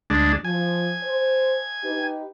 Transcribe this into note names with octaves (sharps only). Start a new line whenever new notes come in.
D2 G#3 D4
F3 G#5
C5
D#4 G4 B4